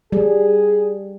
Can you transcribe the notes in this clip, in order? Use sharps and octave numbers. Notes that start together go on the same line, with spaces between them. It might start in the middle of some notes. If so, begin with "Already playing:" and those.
G3 G#4